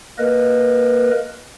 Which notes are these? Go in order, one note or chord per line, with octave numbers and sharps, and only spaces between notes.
A#3 A#4 B4 D#5